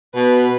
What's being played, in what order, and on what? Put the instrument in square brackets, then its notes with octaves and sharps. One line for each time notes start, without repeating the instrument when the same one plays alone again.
[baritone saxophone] B2 [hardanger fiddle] B4